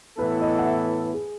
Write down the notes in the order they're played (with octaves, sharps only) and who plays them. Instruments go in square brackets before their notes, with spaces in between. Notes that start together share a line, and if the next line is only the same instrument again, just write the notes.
[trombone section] A2 E3 B3 E4 A4 [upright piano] B4
[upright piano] D#5
F#5
E5
G#4